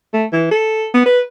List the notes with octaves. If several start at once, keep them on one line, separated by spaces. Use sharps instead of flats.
A3
E3
A4
B3
B4